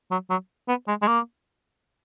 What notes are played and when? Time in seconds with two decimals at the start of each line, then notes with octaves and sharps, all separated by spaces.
0.11 F#3
0.30 F#3
0.68 B3
0.88 G#3
1.02 G#3
1.07 A#3